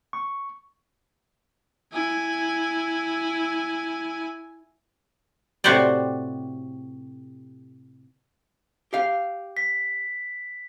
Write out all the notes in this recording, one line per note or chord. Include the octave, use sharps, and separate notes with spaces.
C#6
E4 G#5
A2 C3 F#4 G4 C5 D5
G4 F5
B6